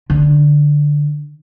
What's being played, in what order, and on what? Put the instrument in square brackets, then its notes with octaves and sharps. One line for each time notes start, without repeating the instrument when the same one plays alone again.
[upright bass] D3